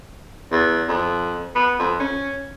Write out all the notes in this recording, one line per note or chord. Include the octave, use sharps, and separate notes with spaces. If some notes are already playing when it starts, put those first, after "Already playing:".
E2
F2
B3
F2
C#4